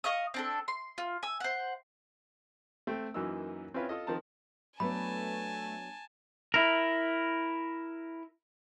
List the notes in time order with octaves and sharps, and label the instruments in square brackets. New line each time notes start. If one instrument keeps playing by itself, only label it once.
[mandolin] D#5 F5 C#6 D#6
C4 D4 A4
C6
F4
G#5 E6
C5 F#5
[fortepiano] A3 C4 G5
F#2 E3 F#3 A#3 D#4 E6
C4 C#4 E4 F4 B4 C#5
F4 A4 D#5
D#3 F3 C4 A#4 A5 A#5
[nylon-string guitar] F#3 B3 D4 [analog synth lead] A3 [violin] G#5 A5 [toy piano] B5
[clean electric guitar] E4 A#4